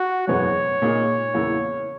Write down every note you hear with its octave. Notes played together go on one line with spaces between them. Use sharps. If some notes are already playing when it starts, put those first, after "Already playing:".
Already playing: F#4
F#1 E2 B2 G#3 B3 C#5
A#2 A#3 D#4 G#4
E2 C#3 E3 A#3 E4